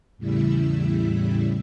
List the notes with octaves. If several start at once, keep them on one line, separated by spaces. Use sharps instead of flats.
E2 A2 C#3 G3 E4 E5